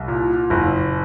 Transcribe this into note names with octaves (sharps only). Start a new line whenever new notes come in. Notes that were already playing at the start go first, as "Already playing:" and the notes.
Already playing: C2
A#2
F#1